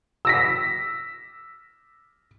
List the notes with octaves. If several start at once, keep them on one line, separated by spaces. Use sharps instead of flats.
E6 A#6 B6